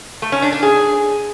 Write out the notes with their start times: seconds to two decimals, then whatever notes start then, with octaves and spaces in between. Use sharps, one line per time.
0.22 A3
0.32 C#4
0.42 D4
0.52 D4
0.63 G#4